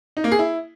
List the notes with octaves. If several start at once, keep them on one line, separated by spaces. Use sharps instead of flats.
D#4
A#3
G#4
E4